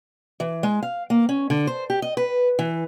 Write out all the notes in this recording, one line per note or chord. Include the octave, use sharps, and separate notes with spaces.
E3
G#3
F5
A#3
C#4
D3
C5
G4
D#5
B4
E3